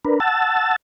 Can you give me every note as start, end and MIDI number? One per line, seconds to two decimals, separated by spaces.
0.05 0.20 62
0.05 0.20 70
0.05 0.20 71
0.20 0.76 78
0.20 0.76 81
0.20 0.76 88
0.20 0.76 93